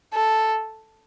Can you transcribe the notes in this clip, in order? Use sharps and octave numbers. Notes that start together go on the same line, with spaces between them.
A4